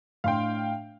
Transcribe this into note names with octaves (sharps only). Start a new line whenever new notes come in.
A2 D4 F5 G5 C6